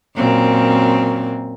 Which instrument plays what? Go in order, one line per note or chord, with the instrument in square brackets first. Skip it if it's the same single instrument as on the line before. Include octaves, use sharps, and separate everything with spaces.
[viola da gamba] F#2 A#2 C4